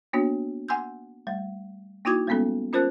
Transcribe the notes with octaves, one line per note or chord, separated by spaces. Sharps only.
A#3 B3 D4 F#4 C#5
F#5 G#5 C6 E6 G6
G3 A3
A#3 D#4 E4 F#4 D6 G#6
G3 G#3 A#3 B3 C#4 A4
C#4 F4 A#4 C5 A5 F#6